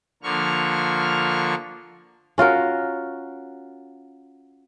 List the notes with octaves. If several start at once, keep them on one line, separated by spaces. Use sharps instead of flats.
D3 F3 A#3 C#6 F6
C#4 F4 F#4 A#4